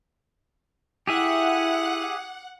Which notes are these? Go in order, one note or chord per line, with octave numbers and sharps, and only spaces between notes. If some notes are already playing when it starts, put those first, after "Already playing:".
E4 G4 G#4 E5 F#5